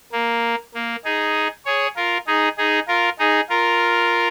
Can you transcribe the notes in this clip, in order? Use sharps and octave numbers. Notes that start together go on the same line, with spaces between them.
A#3
A#3
D#4 G#4
G#4 C#5
F4 A#4
D#4 G#4
D#4 G#4
F4 A#4
D#4 G#4
F4 A#4